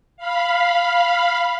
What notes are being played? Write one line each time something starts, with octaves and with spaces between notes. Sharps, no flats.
F5 B5